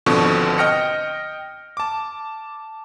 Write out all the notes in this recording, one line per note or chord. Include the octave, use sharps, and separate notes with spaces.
G#1 B2 D3 F3 C4 C#6
D#5 G5 F6 A#6 C#7
A5 D6